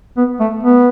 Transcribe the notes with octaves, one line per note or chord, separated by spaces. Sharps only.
B3
A3
B3